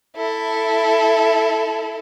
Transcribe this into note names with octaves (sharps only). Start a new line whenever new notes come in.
E4 A4